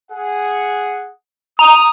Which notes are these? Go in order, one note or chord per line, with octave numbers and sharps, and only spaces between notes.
G#4 F#5
A#5 D#6